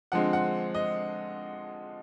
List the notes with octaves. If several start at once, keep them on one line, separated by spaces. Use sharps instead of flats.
D3 F3 G#3 C4 F#5
F#5
D#5